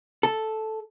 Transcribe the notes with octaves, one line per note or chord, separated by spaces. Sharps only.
A4